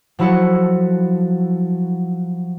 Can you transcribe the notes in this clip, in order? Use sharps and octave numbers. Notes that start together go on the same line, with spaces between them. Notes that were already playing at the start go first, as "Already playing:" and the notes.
F3 F#3 E4 F#4 A4